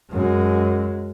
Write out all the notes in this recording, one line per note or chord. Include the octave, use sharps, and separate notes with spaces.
F#2 G#3